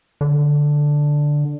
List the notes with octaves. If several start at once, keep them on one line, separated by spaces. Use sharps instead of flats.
D3